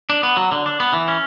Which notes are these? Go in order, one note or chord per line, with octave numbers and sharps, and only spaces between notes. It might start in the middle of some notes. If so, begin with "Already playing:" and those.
D4
B3
F#3
D3
D4
B3
E3
C#4